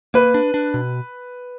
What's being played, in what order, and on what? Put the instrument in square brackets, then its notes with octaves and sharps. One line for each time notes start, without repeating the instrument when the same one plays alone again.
[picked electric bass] A#3 [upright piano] B4
[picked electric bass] D4
D4
B2